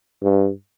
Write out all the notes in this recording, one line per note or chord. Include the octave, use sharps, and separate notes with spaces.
G2